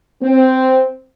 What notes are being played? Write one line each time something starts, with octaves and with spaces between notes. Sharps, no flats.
C4